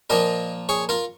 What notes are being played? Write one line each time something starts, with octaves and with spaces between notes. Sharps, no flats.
A#2 F3 A#3 A#4 D#5
G#4 C#5
F4 A#4